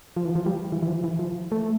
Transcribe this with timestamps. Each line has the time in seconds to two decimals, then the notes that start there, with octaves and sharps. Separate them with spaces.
0.16 F3
0.25 E3
0.35 F3
0.46 G3
0.72 E3
0.83 E3
0.88 F3
1.04 E3
1.19 F3
1.52 A3